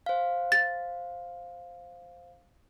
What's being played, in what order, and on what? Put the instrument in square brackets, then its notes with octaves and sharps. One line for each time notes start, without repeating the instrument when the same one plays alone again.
[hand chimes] C5 F5
[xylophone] A6